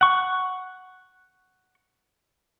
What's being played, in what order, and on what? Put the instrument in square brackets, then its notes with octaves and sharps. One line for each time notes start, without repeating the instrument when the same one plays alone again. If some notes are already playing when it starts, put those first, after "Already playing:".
[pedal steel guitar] F#5 C#6